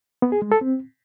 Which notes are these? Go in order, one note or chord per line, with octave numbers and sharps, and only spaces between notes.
B3
G#4
G#3
A4
C4